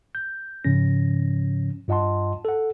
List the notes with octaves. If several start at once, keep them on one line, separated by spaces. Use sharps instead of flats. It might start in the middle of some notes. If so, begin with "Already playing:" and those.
G6
G#2 C#3 F3 C#4 A#6
G2 F4 D#5 F#5 A5 C6
A4 F#5